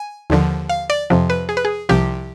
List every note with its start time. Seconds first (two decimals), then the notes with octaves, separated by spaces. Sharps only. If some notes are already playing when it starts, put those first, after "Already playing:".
Already playing: G#5
0.30 D#2 D3 F3
0.69 F5
0.90 D5
1.10 F2 C3 F3
1.30 B4
1.49 G#4
1.57 B4
1.65 G#4
1.89 C2 C3 F3 G4